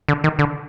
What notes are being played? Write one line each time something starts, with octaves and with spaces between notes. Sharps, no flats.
D3
D#3
D3